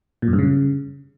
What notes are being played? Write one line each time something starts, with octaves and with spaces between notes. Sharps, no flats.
A#2
F#2
G2
C#3